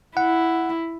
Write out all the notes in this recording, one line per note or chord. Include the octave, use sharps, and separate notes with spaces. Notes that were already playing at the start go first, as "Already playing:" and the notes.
E4 F#5